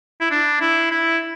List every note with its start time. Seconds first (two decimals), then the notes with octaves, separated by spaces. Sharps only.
0.21 E4
0.31 D4
0.61 E4
0.91 E4